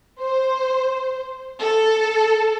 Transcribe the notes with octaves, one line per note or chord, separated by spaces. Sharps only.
C5
A4